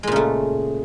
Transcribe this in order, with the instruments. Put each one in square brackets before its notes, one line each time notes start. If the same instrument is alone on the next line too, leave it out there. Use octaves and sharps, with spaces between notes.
[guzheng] G#3
A#2
C#3
A3